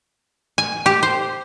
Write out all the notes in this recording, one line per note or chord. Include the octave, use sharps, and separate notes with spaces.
G#5
G4
C5